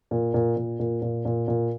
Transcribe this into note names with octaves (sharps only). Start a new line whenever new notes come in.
A#2
A#2
A#2
A#2
A#2
A#2
A#2